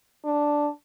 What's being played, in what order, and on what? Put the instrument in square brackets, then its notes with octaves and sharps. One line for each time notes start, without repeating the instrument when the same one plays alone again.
[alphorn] D4